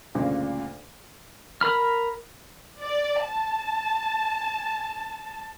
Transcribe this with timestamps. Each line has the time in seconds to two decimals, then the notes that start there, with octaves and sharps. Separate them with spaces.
0.15 D2 G2 A#2 C#3
1.61 A#4 B5 F6
2.81 D5
3.24 A5